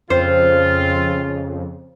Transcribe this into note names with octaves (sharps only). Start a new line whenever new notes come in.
F2 C#3 C4 F4 C5